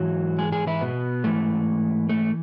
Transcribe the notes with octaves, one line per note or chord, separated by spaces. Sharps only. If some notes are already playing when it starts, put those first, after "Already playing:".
Already playing: G#2 E3 F#3 F#4
G#3 G#4
G#3 G#4
E3 E4
B2 B3
G#2 E3 A3
A3